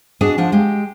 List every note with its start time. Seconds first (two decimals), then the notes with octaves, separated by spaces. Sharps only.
0.21 D4 F#4 G#4 D5 D#5
0.38 F3 D4 F#5
0.52 G#3 G4